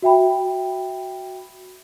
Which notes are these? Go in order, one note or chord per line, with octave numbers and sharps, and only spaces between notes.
F#4 E5 G5 B5